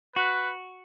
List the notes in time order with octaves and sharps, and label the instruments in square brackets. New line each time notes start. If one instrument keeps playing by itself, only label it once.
[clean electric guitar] F#4 [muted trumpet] B4